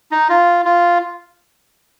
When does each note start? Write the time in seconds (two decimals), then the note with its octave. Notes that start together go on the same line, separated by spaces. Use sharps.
0.11 D#4
0.29 F4
0.65 F4